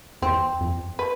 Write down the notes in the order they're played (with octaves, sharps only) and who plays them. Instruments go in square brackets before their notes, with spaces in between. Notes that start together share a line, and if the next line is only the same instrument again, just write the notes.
[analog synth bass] E2 [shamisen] C4
[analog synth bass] F2
[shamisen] B4